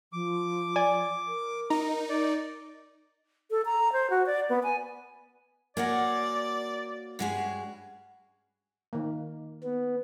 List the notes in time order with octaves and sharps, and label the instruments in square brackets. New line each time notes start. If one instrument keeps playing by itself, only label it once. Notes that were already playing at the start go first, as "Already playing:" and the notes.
[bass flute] F3 [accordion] D6
[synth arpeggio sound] D5 G#5
[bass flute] A#4
[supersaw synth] D#4 [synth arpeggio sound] A#5
[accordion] D5
[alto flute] A4
A#5
C5
F#4
D5
B3
G#5
[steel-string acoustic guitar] A#3 F#4 C#5 [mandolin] A#4 F#5 G#5 [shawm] D5
[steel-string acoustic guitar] G2 G#3 G#4 [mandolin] C#4 F#4 B4
[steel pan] D#3 A#3
[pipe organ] B3